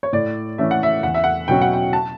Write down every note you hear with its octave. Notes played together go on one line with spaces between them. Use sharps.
C#5
A2 D5
E3 A3 C#4 E5
F#5
E5
E2 F#5
E5
F#5
B2 F#3 C#4 G5
F#5
G5
A5